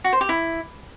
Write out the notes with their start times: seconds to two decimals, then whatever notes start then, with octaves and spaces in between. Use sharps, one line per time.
0.04 F#4
0.13 C5
0.21 G4
0.29 E4